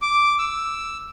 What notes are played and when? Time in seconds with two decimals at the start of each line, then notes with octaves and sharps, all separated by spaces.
0.02 D6
0.39 E6